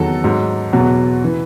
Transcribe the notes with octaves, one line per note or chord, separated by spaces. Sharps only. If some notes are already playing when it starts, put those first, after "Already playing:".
Already playing: E2 D#3 F#3 A4
G#2 F#3
E2 B2 F#3
E3